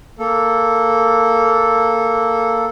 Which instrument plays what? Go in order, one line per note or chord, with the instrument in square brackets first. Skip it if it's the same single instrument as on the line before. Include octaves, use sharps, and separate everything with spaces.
[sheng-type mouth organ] A#3 A4